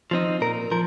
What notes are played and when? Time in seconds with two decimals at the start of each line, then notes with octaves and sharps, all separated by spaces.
0.11 F3 C4 D#4
0.41 A#2 A#4
0.71 F3 A#4